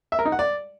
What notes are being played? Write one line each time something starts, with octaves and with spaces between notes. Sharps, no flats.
E5
A#4
D#4
F#5
D5